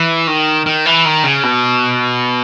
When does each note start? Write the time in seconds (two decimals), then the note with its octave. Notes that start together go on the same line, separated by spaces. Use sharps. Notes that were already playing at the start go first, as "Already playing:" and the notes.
Already playing: E3
0.27 D#3
0.66 D#3
0.86 E3
1.05 D#3
1.24 C#3
1.43 B2